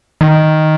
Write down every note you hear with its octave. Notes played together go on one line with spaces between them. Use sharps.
D#3